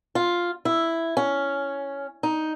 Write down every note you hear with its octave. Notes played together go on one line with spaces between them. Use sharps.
F4
E4
C#4
D#4